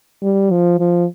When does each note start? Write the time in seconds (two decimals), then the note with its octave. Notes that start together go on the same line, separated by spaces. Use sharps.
0.22 G3
0.51 F3
0.79 F3